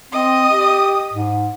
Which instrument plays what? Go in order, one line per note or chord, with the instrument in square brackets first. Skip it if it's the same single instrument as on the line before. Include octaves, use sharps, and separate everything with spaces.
[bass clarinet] C4 [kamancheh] D#5 D#6
[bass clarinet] G4
G#2